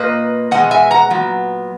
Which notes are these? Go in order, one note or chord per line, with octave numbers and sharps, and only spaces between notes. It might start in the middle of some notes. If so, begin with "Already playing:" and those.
Already playing: A#2 A#3 B4 D#5
B2 G#3 B3 D#5 F#5
E5 G#5
F#5 A#5
A#2 F#3 B3